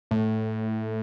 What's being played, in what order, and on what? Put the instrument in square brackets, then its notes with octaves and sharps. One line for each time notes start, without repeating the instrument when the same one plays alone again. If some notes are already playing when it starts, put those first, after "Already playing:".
[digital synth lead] A2